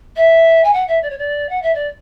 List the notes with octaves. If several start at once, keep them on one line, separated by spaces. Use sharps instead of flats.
E5
G#5
F#5
E5
D5
C#5
D5
F#5
E5
D5